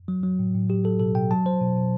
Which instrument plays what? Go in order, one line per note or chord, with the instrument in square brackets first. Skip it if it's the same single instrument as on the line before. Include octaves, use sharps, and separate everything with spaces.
[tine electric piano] F#3
F#3
A2
A2
F#3 G4
F#3 A4
B2 A4
B2 G5
F#3 A5
F#3 C5
B2
B2